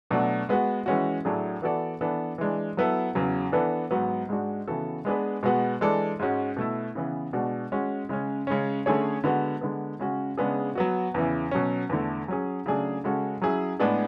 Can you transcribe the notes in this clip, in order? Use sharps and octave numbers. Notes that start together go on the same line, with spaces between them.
B2 F#3 A3 D4 F#4
G#3 B3 F#4
E3 G#3 C#4 F#4
A2 F#3 A3 D4 G#4
E3 B3 F#4 A4 D5
E3 B3 D4 A4
E3 G#3 D4
F#3 B3 E4 A4
E2 C#3 F#3
E3 B3 D4 A4
G#2 F#3 B3 F#4
G#2 G#3 D4 F#4
C#3 E3 B3 F#4 A4
G#3 B3 D4 G#4 B4
B2 G#3 B3 F#4
E3 G#3 D4 A4 D5
G#2 G#3 C#4 F#4
B2 A3 E4
C#3 E3 B3
B2 G#3 D4 F#4
G#3 C#4 F#4
C#3 G#3 C#4
C#3 G#3 C#4
D3 A3 C#4 G#4 C#5
D3 G#3 B3 F#4
D3 G#3 B3
C#3 G#3 C#4 F#4
C#3 G#3 B3 D4 G#4
F#3 B3 F#4
E2 C#3 E3
B2 F#3 C#4
E2 D3 A3
F#3 C#4 G#4
C#3 F#3 A3 D4 G#4
C#3 G#3 C#4 F#4 A4
F#3 C#4 E4 G#4
A2 G#3 B3 D4 G#4